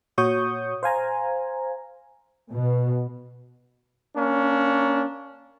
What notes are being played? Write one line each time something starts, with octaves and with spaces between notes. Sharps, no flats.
A#2 F#4 C#5 C#6 D#6 G6
C5 F5 G#5 A#5
B2
A#3 C#4 D4